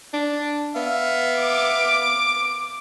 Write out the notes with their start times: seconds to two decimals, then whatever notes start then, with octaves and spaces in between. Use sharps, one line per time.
0.13 D4
0.76 B3 E5 F5
1.39 D6 D7